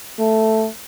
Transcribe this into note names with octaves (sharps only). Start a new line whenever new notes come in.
A3